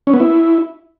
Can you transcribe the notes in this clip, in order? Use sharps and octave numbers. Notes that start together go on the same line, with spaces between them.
C#4
B3
E4